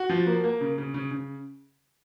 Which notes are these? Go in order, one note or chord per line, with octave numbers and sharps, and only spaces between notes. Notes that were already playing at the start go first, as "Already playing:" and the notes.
Already playing: F#4
F3
A#3
A#3
C#3
C#3
C#3
C#3